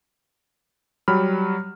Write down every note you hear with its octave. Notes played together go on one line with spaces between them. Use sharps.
F#3 G3 B5 F6